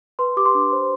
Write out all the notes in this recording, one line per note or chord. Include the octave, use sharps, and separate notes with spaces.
B4 C6
G4 D6
C6
D4
C5